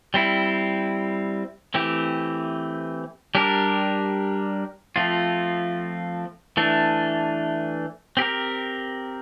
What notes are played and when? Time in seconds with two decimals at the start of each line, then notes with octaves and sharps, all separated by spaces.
0.14 G3 C4 E4
1.74 E3 A3 C4 G4
3.35 G3 D4 G4 A#4
4.96 F3 A3 C4 F4
6.57 E3 A3 D4
8.17 C4 G4 A#4